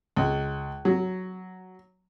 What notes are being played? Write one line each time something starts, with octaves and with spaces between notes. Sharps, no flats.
C#2
F#3